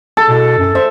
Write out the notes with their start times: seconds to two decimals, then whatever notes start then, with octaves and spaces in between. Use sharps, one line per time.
0.17 A4
0.29 B2
0.58 F#2
0.75 C5 E5